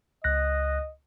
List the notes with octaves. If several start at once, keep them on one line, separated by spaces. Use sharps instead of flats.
C#2 D#5 F#6 A#6